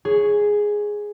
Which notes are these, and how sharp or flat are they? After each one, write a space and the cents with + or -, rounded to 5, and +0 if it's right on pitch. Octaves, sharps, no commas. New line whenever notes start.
G#4 +0 C#5 +0